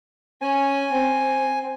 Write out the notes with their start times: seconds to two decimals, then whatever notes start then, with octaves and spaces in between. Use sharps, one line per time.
0.41 C#4 G#5
0.92 C4